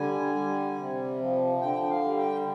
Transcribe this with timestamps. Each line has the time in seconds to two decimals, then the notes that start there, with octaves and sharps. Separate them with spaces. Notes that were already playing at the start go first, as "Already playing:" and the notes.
Already playing: D3 G3 G#5
0.35 G3
0.78 C3
1.20 F3
1.61 D3 G5
1.82 G5
1.90 F5
2.04 G3
2.18 G5